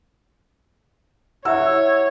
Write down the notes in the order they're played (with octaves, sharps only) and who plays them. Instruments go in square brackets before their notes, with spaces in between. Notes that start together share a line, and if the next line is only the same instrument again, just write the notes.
[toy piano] E4 G4 E5 [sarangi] C#5 [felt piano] F#5 E6